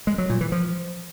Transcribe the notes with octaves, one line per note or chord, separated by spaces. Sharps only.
G#3
F#3
A#2
E3
F3